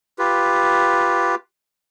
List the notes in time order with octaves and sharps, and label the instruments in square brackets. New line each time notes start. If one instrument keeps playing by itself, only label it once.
[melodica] F4 G4 B4